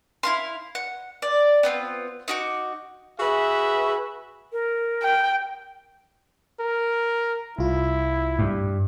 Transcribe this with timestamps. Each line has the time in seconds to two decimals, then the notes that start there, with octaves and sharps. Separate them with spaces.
0.23 E4 F5 C6
0.75 F#5
1.22 D5
1.63 B3 C4 F4
2.28 D#4 F#4 D6
3.19 F#4 G#4 B4 E5
4.52 A#4
5.03 G5
6.60 A#4
7.59 C2 E4 F4
8.39 G2